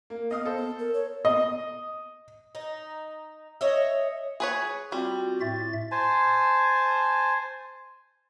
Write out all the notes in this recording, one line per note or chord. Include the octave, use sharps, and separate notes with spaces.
A#3
B3 D#5 F5 D#6
A4 C5
B3
A#4
C#5
D#5
D#4
C#5 D#5 E5
G#4 B4 C#5
G3 C4 F4 F#4
A2 E5 A6
C5 G#5 A5